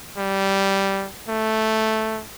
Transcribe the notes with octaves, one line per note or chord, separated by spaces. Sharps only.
G3
A3